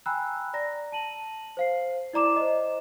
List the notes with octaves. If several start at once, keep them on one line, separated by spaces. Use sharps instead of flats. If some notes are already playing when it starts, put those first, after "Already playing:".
G5 G#5 A#5 B5 E6 F#6
D5 A#5 A#6
A5 D#7 F#7
C5 F5 C7
E4 D5 A#5 D6 E7
C5 D#5